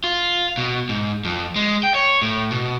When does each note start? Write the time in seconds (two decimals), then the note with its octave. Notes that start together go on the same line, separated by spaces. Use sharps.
0.04 F4
0.58 B2
0.89 G#2
1.25 F2
1.56 G#3
1.83 G5
1.95 C#5
2.22 A2
2.51 B2